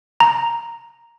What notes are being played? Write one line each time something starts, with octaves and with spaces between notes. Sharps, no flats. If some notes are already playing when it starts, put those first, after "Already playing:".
A#5